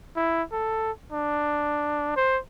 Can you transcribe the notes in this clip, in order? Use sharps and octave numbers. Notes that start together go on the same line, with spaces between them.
E4
A4
D4
C5